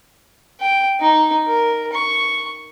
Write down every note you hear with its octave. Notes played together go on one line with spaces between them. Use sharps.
G5
D#4
A#4
C#6